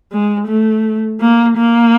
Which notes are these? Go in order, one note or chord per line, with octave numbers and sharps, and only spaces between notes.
G#3
A3
A#3
A#3